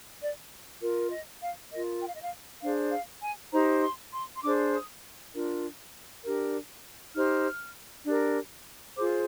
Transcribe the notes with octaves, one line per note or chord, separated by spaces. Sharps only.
D5
F4 A#4
D#5
F5
F4 A#4 D#5
G5
F5
D#5
F5
D4 G#4 C5 F5
F5
G#5
D#4 G4 C5 A#5
C6
C6
C6
D4 G#4 C5 D6
D#6
D4 F4 A#4
D4 G4 A#4
D#4 G4 C5 F6
D4 G4 A#4
F4 G#4 C5 D6